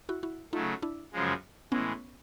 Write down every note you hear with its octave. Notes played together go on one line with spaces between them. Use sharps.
E4 F#4
E4 F#4
C#3 F#3 A3 D#4 F4
D4 E4
F#2 C#3 F3 G#3
A2 E3 G#3 B3 C#4